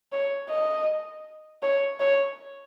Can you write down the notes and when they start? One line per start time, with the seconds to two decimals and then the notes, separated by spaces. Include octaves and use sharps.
0.13 C#5
0.50 D#5
1.63 C#5
2.00 C#5